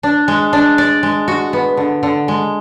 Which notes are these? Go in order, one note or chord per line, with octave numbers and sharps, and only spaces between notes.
D4
G#3
D4
D5
G#3
F#4
B3
D3
D3
G#3